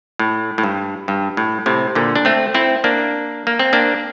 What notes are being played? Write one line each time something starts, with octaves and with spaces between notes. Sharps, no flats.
A2
A2
G2
G2
A2
A2 C3
A#2 D3
D4
A3 C4
C4 E4
A#3 D4
A#3
C4
A#3 D4